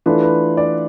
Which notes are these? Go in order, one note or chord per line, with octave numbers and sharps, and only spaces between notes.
E3 A3 D4 F4 B4
B4
D5